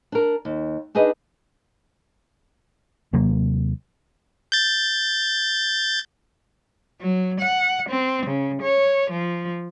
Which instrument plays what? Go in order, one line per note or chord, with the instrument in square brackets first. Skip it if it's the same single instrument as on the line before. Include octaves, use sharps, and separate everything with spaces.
[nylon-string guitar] D4 A#4
D#2
D4 D#4 G#4 B4 D#5
[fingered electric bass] D#2 C3 F#3 A#3
[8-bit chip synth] G6 A6
[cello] F#3
F#5
C4
C#3
C#5
F3